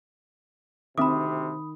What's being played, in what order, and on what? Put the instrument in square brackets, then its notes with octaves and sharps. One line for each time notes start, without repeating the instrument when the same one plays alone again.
[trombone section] D2 C3 [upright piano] D#3 [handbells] C4 E5 D6 [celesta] B5 D#6